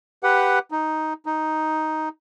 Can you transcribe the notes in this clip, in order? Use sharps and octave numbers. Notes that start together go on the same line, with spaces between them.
G4 B4 F#5
D#4
D#4